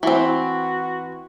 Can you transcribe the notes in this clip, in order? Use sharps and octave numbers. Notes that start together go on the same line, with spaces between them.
E3 C4 F#4